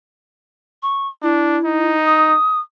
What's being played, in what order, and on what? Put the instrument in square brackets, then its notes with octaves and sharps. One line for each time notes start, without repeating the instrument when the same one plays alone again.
[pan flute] C#6
[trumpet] D4 [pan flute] E4
[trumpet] D#4
[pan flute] D#6